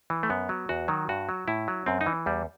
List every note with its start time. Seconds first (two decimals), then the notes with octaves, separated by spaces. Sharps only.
0.10 E3
0.23 A3
0.30 F#2 B3
0.49 F#3
0.69 E2 F#4
0.88 D#3 F#3
1.09 G2 F#4
1.29 F#3
1.48 A2 E4
1.68 F#3
1.86 F#2 C4
2.01 D#4
2.06 E3
2.26 E2 G3